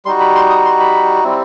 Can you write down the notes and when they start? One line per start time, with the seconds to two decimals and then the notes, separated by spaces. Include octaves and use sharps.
0.05 G3 D#4 F#4 C6
0.20 B5
0.35 C6
0.50 D#6
0.65 C6
0.80 B5
1.24 G3 C4 E4